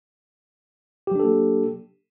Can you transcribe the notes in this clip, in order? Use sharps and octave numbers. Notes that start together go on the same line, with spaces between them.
F#3 A#3 D4 G4 A4